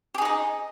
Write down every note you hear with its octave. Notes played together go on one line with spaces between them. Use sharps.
D#4 G4 G#4 D#5